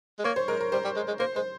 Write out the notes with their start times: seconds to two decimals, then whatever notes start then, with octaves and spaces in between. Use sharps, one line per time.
0.19 G#3
0.24 A#3 C#5
0.36 C5
0.48 G#3 A#4
0.61 A#4
0.72 G3 C5
0.84 G3
0.96 G#3
1.08 G#3
1.19 A#3 C5
1.35 G#3 C5